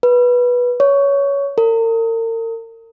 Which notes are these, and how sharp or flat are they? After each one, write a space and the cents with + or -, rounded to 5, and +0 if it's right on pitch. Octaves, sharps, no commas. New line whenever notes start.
B4 -15
C#5 +15
A#4 -40